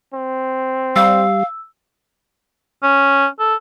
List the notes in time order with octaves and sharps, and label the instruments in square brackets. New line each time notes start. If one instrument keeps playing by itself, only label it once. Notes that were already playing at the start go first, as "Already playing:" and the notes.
[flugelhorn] C4
[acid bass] G3 [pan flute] F5 [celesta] E6
[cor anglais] C#4
A4